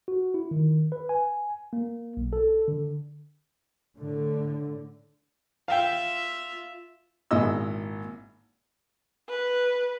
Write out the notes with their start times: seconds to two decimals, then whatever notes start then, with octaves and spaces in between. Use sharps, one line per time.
0.08 F#4
0.34 E4
0.51 D#3
0.92 B4
1.09 G#5
1.73 A#3
2.17 B1
2.33 A4
2.68 D3
3.97 A2 D3
5.68 F4 E5 F5 G5
7.31 G#1 A#2 E4 D#5 E6
9.29 B4